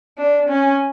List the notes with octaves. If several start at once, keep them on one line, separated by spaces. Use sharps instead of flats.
D4
C#4